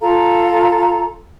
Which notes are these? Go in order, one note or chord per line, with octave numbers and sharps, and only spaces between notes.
F4 A4 F5 A#5